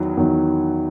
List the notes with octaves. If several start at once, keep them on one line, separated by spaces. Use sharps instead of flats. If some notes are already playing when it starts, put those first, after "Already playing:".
Already playing: E2 D#3 F#3
E2 D#3 F#3